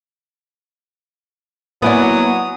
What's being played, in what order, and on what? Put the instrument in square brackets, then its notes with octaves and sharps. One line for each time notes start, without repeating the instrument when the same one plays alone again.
[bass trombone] F#3 [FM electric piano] A#3 E5 G#5 [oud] B3 E4 D5 [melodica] D#6